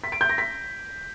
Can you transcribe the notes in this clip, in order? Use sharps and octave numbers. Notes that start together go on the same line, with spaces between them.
B6
D7
G6
A#6
B6